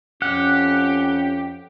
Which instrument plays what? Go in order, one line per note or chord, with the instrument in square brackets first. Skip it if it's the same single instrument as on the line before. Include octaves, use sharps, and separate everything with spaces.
[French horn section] F2 C#4 [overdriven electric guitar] G4 [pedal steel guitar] F#5